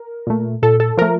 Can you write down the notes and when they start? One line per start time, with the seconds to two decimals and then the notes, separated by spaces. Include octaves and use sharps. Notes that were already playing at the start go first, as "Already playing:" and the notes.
Already playing: A#4
0.27 A#2 A3
0.63 A#2 A4
0.80 A4
0.97 F3 A3 A#4